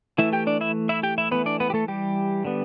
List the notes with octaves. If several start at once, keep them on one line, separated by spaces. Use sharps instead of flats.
E3 A3 E4 E5
G4 G5
D4 D5
E4 E5
E4 E5
G4 G5
E4 E5
E3 A3 B3 B4
D4 D5
B3 B4
G4
A3 A4
G3 G4
D3 G3 B3